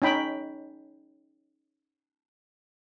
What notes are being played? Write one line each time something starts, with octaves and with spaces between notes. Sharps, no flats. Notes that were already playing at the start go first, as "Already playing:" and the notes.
C#4 D#4 G5 B5